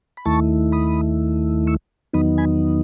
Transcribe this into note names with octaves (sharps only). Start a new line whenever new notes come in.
B5
D#2 D#3 A3 E4 A5 C#6
B5 D#6
C#6 E6
E2 D#3 F#3 B3 D#4 B5 D#6
G#5 B5